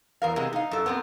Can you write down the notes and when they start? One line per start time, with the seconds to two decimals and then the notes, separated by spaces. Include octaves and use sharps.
0.22 E2 A#4 F5
0.36 C3 G#3 B3
0.53 D#4 F5
0.71 F#2 A4
0.86 B3 C4 A#4